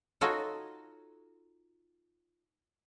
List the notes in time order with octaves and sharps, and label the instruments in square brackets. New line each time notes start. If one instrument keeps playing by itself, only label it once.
[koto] D#4 F4 F#4 A4 C#5 D#5